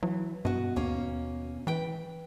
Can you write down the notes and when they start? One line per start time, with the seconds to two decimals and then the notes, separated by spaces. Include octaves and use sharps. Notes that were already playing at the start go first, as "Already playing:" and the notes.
0.03 E3 F#3
0.45 G2 B2 F#4 D#5
0.76 D#2 A#3 C#4
1.67 E3 B4 G5